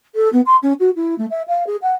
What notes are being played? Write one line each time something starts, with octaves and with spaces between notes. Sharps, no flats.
A4
B3
C6
C#4
F#4
E4
A3
E5
F5
G#4
F#5